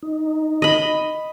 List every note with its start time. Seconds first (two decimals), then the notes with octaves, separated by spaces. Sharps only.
0.03 D#4
0.62 D#5 B5